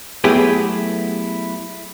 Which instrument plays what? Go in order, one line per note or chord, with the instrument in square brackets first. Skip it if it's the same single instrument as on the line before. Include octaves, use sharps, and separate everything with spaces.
[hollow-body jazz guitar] F#3 A3 B3 E4 G4 G#4